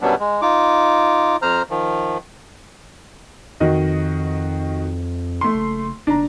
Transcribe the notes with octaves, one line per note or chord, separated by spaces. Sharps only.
F#2 B2 F#3 G3 B3 D4
G#3
D#4 F4 D6
F2 C5 A#5 F6
D#3 F3
F2 D#3 F#4 D#5
A3 C6
F#1
F#1 D4 A#5